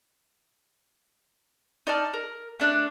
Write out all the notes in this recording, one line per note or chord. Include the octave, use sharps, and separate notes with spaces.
D#4 D5 A5 F6
A#4
A3 D4 D5 F#6